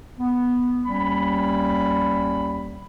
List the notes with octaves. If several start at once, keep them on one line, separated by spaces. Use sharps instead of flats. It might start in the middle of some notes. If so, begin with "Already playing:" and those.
B3
D#2 G3 C#4 B5